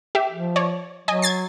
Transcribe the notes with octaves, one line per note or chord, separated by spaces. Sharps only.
G4 E5
F3
C#5 D5
F#3 D#5 G#5
G#6 A6 C7